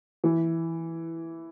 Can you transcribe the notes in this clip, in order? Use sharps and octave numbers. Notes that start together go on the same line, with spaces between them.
E3